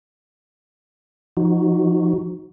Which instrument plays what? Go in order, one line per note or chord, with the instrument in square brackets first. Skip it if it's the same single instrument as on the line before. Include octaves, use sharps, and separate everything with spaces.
[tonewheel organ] F3 D#4 F#4